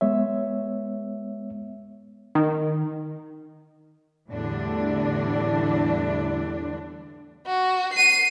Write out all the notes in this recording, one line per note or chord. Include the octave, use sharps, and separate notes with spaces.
G#3 B3 C#5 E5
D#3
E2 A2 D3 G3 D4
F#4
C7 D#7